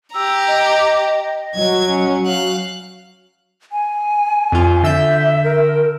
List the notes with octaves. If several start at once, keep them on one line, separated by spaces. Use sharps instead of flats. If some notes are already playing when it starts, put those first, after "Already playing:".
G4 A#5 E6
D#5
F#3 G#6
C#4
F5 F#6
G#5
F2 F4
D3 E5 E6 G6
A#4